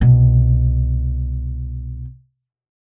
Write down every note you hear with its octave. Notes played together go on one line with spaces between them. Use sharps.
C2 B2